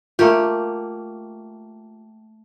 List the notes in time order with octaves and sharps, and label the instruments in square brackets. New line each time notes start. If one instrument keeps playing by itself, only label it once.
[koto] A3 A#3 G4 [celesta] F4